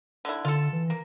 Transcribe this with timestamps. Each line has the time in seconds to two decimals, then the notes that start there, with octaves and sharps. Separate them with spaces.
0.25 D3 E4
0.45 D3 F4 A4
0.72 E3
0.90 A#3